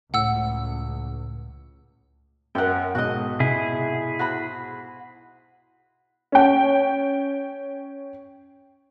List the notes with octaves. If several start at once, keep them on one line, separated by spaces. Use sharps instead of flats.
C#2 A2 F#5 E6
F#2 A#4 F#5 G5
B1 G#2 F#4 D#5
C3 E4 G#4
F#4 C5 B5
C#4 G5